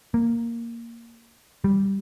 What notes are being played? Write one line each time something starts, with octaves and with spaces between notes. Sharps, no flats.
A#3
G3